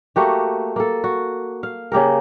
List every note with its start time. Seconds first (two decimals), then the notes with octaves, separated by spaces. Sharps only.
0.16 A3 A#3 F#4 G4
0.76 A#3 A4
1.04 F#4
1.63 F5
1.92 C#3 A#3 G4 A#4